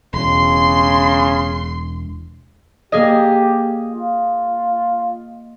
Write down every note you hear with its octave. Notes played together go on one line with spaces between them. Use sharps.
E1 C#3 C6
A#3 G4 G#4 D#5
F4